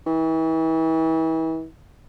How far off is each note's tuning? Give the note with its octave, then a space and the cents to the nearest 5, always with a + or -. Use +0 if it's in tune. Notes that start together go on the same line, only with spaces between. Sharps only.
E3 -35